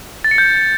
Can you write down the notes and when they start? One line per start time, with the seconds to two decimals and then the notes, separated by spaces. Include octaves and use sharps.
0.24 A6
0.31 C#7
0.38 G6